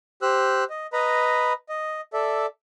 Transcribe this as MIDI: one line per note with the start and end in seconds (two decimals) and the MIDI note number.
0.22 0.64 67
0.22 0.64 72
0.22 0.64 88
0.22 0.64 90
0.70 0.87 75
0.93 1.53 71
0.93 1.53 75
0.93 1.53 82
0.93 1.53 83
1.69 2.01 75
2.13 2.46 69
2.13 2.46 74
2.13 2.46 76